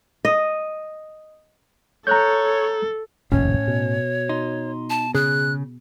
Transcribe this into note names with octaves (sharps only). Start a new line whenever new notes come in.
D#5
A4 C#5 A#5 F#6 G6
F1 A#1 D#2 A2 C#4 C#5
B2
D#4 C6
A5
C#3 G#4 F#6